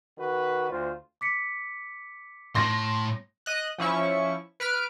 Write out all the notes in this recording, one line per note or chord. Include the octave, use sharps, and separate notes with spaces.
D#3 F#4 B4
D2 F4 C5
D6 B6 C#7
A2 C6 A#6
D#5 F#6
F3 C#4 E4 C#6
B4 F6 D7